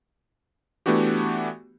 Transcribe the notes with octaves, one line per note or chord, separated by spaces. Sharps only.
E3 A3 B3 D4 F#4 G4